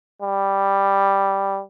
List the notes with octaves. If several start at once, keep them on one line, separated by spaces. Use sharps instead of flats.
G3